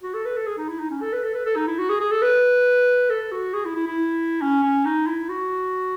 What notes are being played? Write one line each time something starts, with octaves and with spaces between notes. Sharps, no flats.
F#4
A4
B4
A4
G#4
D#4
E4
D#4
C#4
A4
B4
A4
B4
A4
D#4
E4
F#4
G#4
G#4
A4
B4
A4
F#4
G#4
E4
E4
E4
C#4
C#4
D#4
E4
F#4